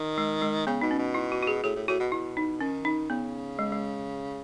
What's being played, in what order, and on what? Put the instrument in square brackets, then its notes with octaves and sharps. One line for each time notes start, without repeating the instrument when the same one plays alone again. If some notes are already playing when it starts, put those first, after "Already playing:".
Already playing: [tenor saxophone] D#3
[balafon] G#3
G#3
[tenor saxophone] C#3 [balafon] B3
[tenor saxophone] B2 [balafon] D#4
[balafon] C#4
[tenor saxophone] B2
[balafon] E4
F#4
F#4
G#4
[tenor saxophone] A2 [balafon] G#4
[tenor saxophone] A2
[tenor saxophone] A2 [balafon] F#4
[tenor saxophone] B2
[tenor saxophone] B2 [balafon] E4
[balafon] D#4
[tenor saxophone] D#3 [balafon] C#4
[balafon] D#4
[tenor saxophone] C#3 [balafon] B3
[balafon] G#3
G#3